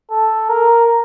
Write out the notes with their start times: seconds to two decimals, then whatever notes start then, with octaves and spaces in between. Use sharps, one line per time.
0.11 A4
0.49 A#4